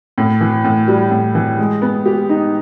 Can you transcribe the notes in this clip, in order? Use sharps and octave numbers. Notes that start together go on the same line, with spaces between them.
A2
E3
A2
G3
A2
E3
G#3
B3
G4
D#4